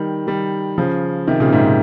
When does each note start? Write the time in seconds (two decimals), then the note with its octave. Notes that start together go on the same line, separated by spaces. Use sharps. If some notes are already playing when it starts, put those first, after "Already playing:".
Already playing: D#3 G3
0.27 D#3 G3
0.78 C#3 F3
1.27 C3 D#3
1.40 A#2 C#3
1.52 G#2 C3